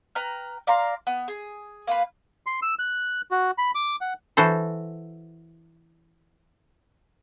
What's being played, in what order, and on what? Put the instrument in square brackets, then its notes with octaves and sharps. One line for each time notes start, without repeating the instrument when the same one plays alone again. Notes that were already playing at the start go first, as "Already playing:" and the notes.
[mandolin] B4 G5 A#5 F6
D5 F5 A#5 C6
B3
G#4
A#3 F4 B4
[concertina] C6
E6
F#6
F#4
B5
D6
F#5
[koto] E3 F#4 A4 C5